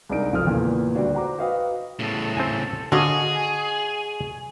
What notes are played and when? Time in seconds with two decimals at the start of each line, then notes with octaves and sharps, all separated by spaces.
0.09 C2 G#3 D4 D#4 A#4 D7
0.32 F#1 F2 F3 A4 D#6 F6
0.46 E2 A#2 C#3 E3
0.95 D2 G3 D4 F#4
1.13 C5 F#5 A#5 D6
1.38 F#4 B4 D#5 F5 G5 D#6
1.99 A2 C#3 A4
2.37 C4 A4 G#5
2.92 D3 C#4 F#4 G#4 D#5 F5 G#5 C#6